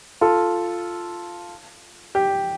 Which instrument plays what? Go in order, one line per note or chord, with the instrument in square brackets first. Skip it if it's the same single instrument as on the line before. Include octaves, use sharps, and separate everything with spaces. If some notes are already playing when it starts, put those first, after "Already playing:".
[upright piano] F4 A4
G4